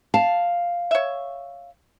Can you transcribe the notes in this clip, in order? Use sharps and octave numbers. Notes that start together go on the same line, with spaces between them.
F5 A5
C#5 E5